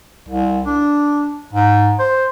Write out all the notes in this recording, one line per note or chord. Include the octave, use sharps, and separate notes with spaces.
C2
D4
G#2
C5